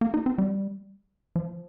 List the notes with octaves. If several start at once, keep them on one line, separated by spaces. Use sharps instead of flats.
A#3
D#4
C4
G3
F3